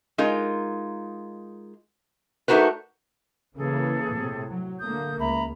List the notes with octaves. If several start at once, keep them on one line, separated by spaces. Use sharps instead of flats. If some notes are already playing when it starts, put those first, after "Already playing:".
G#3 D#4 F4 A#4
A3 D4 D#4 F#4 A#4 B4
C#3 E3 A#3 G#4 A4
A2 C3
F#3
D3 A3 A#3 D#6 G6
C#2 E5 A#5 B5